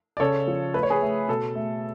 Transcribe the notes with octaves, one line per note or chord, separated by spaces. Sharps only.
D5
C#3 A4 C#5
F3
A3 B4
C#5
G#4 B4
A3
B2 A4
A3